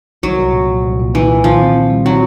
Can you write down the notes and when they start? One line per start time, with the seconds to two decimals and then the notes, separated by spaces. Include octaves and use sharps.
0.23 C2 F#3
0.38 C2
0.53 A#2
0.69 F3
0.84 C2
0.99 A#2
1.14 A#2 E3
1.30 A#2
1.44 D#3 F3
1.60 C4
1.75 E4
1.90 G3
2.05 F#3 C4